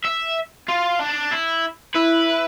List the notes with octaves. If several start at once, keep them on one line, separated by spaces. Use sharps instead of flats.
E5
F4
D4
E4
E4 B4